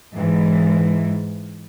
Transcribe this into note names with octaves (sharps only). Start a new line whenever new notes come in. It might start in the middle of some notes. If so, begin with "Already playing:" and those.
G#2 E3